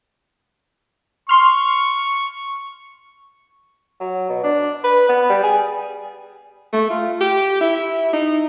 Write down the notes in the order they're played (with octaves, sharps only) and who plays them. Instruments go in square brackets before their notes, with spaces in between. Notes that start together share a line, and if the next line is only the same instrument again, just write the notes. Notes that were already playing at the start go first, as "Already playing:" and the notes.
[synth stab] C6 F6 [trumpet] C#6
[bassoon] F#3
B2
D4
B4
B3
G3
G#4
[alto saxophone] A3
F4
G4
E4
D#4